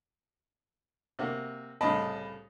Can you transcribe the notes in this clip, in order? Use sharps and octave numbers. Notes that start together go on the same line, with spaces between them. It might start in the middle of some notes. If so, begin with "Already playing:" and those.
C3 A#3 F#4
C2 A2 C#3 D#5 A5 B5